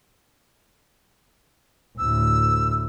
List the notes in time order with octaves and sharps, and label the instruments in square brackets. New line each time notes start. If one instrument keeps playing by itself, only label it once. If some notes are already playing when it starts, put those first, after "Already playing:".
[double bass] D2 A2 [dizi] E6